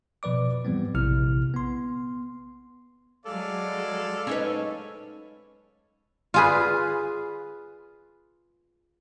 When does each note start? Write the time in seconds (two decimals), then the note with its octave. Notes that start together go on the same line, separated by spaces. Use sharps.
0.23 B2 F3 B4 D5 D6
0.65 G#2 E3 F3 G3 B3 C4
0.94 A#1 C3 E4 F6
1.54 B3 C6
3.26 F#3 G#3 A4 D5 F5
4.27 C#4 D#4 B4
6.34 F4 G#4 B4